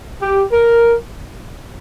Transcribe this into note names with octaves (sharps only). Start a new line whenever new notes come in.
G4
A#4